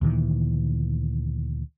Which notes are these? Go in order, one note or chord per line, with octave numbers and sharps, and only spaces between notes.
D2 A#2 D#3 E3